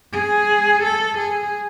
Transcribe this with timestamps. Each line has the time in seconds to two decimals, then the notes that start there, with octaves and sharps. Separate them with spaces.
0.13 G#4
0.83 A4
1.18 G#4